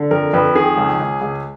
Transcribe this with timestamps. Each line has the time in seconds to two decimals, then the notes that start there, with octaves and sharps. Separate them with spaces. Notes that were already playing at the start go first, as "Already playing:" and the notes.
Already playing: D3
0.11 F2 A#4
0.33 F2 B4
0.55 D#3 G#4
0.77 C#2
0.99 C#2
1.21 C#2